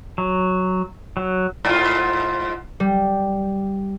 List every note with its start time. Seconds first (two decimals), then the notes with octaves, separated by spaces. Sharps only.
0.18 F#3
1.17 F#3
1.65 G#2 F4
2.80 G3